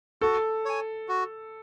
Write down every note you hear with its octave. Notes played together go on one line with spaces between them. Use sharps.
F#4 A4
C#5 G#5
F#4